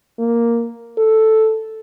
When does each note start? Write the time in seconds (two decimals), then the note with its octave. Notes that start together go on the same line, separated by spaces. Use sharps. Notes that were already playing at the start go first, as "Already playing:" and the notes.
0.19 A#3
0.98 A4